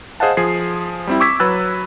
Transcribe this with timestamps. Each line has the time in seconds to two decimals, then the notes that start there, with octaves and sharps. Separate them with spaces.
0.20 G#4 C5 D#5 F5 F#5 A5
0.37 F3 G#4 C7
1.07 G3 C4 E4
1.20 C#6 D6 E6 G#6 B6
1.40 F#3 B4 B5 E6 F#6 A6